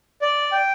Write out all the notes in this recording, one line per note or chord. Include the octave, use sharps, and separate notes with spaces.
D5
G5